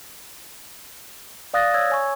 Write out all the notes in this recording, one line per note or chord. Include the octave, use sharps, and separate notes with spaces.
D5 F5 D#6 F#6 A6 A#6
C#5 E6 G#6
C#5 G#5 C#6